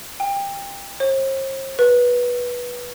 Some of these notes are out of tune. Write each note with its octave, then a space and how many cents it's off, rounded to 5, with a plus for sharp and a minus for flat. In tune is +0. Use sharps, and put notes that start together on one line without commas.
G5 +25
C5 +45
B4 -15